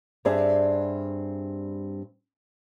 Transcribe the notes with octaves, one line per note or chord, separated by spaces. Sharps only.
G2 G3 C4 D4 G#4 E5